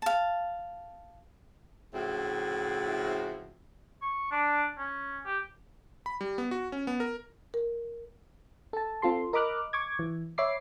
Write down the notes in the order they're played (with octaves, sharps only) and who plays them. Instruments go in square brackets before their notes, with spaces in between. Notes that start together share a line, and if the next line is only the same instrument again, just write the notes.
[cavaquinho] F5 A5
[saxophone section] A2 C#3 F3 C4 E4 F#4
[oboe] C#6
D4
C#4
G4
[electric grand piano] B5
G3
B3
F#4
C#4
B3
A#4
[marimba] A#4
[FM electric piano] A4 A5
C4 F4 A4 C6
A#4 D#5 B5 D6 F6 F#6
C#6 D6 G#6
E3
C#5 E5 B5 D6 C7